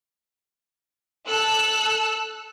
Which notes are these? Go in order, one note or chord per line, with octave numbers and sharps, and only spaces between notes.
A4 E6 F#6